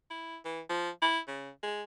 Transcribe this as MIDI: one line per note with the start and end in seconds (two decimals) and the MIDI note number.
0.10 0.38 64
0.45 0.61 52
0.69 0.90 53
1.02 1.19 64
1.28 1.50 49
1.63 1.83 56